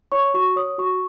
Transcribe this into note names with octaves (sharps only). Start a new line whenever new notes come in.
C#5 C#6
F#4 C#6
C#5 D#6
F#4 C#6